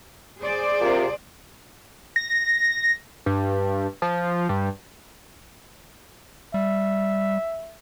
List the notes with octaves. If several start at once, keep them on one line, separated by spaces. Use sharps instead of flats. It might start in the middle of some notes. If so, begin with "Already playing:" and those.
G#4 C5 D5
C3 F4 A#4
A#6
G2
F3
G2
G3 E5